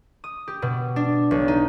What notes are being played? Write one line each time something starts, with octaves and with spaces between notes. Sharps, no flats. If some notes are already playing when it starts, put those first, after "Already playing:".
D#6
G4
B2
D4
B1
D#4